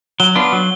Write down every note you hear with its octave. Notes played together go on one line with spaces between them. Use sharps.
F#3 G7
B3 D4 F4
F#3